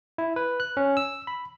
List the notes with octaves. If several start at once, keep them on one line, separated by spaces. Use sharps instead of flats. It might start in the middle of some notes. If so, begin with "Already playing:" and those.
E4
B4
F#6
C#4
E6
B5